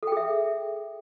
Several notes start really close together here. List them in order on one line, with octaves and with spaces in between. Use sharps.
A4 G5 G#4 E5